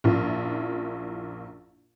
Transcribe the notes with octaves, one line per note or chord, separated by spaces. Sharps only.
A#1 F#2 A#2 F3 E4 F4